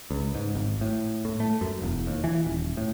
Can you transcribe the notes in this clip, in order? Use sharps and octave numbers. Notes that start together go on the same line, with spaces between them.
C#2
G#2
G#1
A2
A2
A3
F#2
E1
D#2
E3
D#1
A2